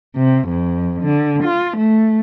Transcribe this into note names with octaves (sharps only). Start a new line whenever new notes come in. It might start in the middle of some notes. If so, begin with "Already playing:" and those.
C3
F2
D3
F4
A3